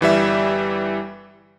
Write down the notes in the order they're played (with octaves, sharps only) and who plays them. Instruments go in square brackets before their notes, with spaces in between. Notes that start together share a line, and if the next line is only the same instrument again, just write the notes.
[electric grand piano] G1 E3 G3 E5